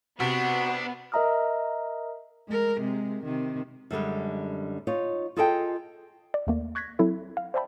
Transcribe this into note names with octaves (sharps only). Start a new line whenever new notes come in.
C3 B3 D4 F#4
A#4 D#5 E5 A#5 D#6 F6
G#3 A#4
C3 G#3
C3 D#3
F#2 D3 G3 G#3
D#4 F4 C#5
F4 G#4 A4 D#5 F#5 G5
D5
D#2 A3 A#3
C#6 F#6 G#6 A#6 B6
F#3 C4 E4 A4 E5
F5
C5 D5 E5 G5 A5 B5